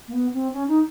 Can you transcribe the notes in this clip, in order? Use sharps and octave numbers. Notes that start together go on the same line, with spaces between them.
A#3
B3
C4
C#4
D#4